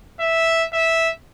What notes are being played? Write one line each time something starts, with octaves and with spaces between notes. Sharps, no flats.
E5
E5